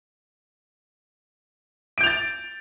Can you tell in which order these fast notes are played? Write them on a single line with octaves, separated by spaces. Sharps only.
D7 G6 F7 A6